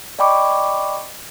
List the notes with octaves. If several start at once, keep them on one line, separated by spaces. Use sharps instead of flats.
D5 D#5 G5 B5 C#6 D6